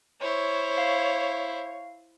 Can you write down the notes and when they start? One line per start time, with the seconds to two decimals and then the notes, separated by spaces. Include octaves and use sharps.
0.21 E4 C5 C#5
0.78 F5